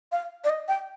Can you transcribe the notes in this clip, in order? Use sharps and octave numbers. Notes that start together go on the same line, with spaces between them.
F5
D5
D#5
G5